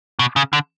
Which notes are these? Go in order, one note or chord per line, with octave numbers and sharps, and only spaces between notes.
B2
C#3
D3